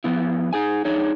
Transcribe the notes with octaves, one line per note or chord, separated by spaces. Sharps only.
F3 B3 E4
D#4 G#4 G#5
D4 D#4 G#4 C#5